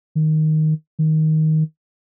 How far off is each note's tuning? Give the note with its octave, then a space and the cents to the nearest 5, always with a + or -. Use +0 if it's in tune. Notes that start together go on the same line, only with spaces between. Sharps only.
D#3 +0
D#3 +10